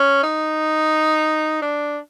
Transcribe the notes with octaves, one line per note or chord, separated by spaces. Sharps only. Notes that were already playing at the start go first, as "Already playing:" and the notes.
Already playing: C#4
D#4
D4